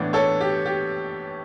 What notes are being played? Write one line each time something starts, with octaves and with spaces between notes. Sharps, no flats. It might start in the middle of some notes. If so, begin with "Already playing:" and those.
Already playing: A2 E3 B3 D4
A4 C#5
G4
G4